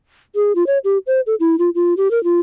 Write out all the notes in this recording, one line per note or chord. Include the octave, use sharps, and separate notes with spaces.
G#4
F4
C#5
G4
C5
A4
E4
F4
F4
G4
A#4
F4